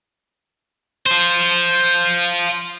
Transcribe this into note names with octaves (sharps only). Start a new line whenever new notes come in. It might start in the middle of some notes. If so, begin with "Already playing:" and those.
F4 C5